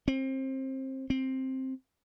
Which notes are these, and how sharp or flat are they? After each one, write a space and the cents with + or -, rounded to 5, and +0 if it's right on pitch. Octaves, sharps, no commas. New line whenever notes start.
C4 +25
C4 +10